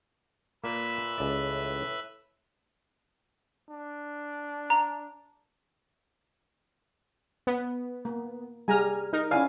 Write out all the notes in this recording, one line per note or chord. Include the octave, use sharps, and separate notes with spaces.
A#2 A#3 B4 E5
C#2 A2 D5
D4
A#5
B3
A#3
G3 G#4 G#5 A#5 F6
D#4 A#4
C#4 E4 B4 D5 F5 G#5